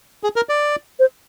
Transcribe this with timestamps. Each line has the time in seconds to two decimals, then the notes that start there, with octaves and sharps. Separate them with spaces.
0.23 G#4
0.36 A#4
0.49 D5
0.99 C5